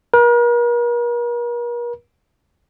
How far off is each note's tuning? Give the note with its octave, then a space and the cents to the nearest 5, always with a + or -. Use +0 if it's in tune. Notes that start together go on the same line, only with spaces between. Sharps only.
A#4 +45